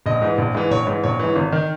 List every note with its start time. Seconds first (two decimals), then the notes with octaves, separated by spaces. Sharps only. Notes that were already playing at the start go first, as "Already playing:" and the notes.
0.06 A#1 D#5
0.22 G#2 E3
0.38 A#1
0.55 G#2 E3
0.70 A#1 C#5
0.87 G#2 E3
1.04 A#1 C#5
1.20 G#2 E3
1.36 G#1
1.52 D#3